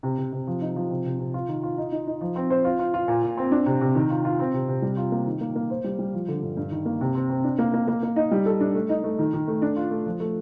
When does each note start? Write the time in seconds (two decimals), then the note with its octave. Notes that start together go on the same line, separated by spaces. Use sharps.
0.03 C3
0.18 C3
0.32 C3
0.47 F3
0.61 D#4
0.76 F3
0.90 C3
1.05 C3
1.19 C3
1.34 F4
1.48 D#3
1.63 F4
1.78 D#4
1.92 D#4
2.07 D#4
2.21 F3
2.36 C4
2.50 C5
2.65 F4
2.79 F4
2.94 F4
3.08 A#2
3.23 A#2
3.37 C4
3.51 D4
3.66 C3
3.81 C3
3.95 D#3
4.10 F4
4.25 F4
4.39 C4
4.54 C3
4.68 C3
4.82 G3
4.97 F4
5.12 A#3
5.26 D#3
5.41 A#3
5.56 A#3
5.70 C5
5.84 G3
5.99 G3
6.14 F3
6.28 D3
6.42 G2
6.57 G2
6.71 D#3
6.86 A#3
7.01 C3
7.15 C4
7.30 C4
7.44 D4
7.59 A#3
7.74 A#3
7.88 A#3
8.03 A#3
8.16 D#4
8.31 G3
8.46 A4
8.60 D4
8.75 A3
8.89 D#4
9.04 A3
9.19 D#3
9.33 D#3
9.48 A3
9.62 D4
9.76 F4
9.91 A3
10.06 F3
10.20 A3